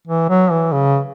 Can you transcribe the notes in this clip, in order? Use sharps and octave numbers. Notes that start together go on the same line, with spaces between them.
E3
F#3
E3
C#3